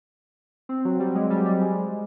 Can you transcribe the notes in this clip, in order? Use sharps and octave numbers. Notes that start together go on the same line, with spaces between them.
C4
F#3
G3
G#3
G3
G3
G#3